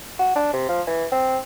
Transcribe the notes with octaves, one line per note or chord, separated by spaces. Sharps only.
F#4
D4
C3
F3
E3
C4